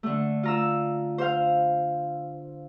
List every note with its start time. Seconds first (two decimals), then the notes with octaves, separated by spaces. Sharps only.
0.03 D3 A3
0.43 F4 A#5 E6
1.18 C5 F5